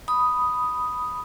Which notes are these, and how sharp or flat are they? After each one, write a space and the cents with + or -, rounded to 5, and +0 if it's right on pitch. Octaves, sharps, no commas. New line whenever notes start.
B5 +0 D#6 +0